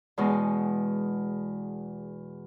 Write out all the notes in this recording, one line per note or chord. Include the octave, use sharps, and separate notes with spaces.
E2 B2 G#3